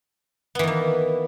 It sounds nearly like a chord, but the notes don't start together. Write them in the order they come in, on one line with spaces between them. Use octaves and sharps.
B3 E3 D#3 A#3